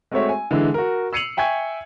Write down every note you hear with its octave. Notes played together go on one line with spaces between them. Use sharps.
G#3 A3 C4 F#4 C#5 E5
G#5
D3 E3 G#3 E4
F#4 A#4
E6 C7 C#7 D#7 F7 F#7
E5 G5 G#5 C#6 G#6